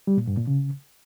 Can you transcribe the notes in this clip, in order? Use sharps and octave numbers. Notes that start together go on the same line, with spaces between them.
G3
A#2
G2
A#2
C#3